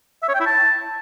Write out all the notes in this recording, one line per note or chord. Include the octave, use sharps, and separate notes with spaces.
E5
C#5
G5
E4
A5